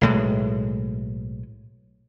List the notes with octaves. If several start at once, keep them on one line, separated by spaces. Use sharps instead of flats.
B1 A2 G#3